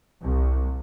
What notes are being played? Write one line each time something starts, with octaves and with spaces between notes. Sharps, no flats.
C2